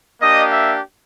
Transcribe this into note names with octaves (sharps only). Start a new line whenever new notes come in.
A#3 D4 G4 D#5
E5